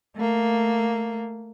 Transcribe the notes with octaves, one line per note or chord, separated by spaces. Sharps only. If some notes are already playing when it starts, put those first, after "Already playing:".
A3 A#3